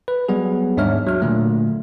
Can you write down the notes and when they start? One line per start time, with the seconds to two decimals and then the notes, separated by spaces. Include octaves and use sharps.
0.08 B4
0.28 F#3 G3 B3 G#4
0.77 D#2 G#2 D4 C#5 E5 F6
1.07 F#3 F6
1.22 A#2 D3 A3